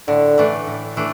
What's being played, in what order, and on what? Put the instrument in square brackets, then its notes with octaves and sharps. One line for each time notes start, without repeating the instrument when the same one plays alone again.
[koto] A2 [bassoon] D3
[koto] E3 A3 D4
A2
E3 A3 D4